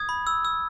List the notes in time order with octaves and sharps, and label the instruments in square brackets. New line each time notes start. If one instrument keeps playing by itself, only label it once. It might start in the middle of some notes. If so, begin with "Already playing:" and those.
Already playing: [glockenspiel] D#6 G#6
B5
E6
E6